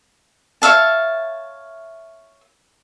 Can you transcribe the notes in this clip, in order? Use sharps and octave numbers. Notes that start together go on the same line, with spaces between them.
C#5 E5 F5 A5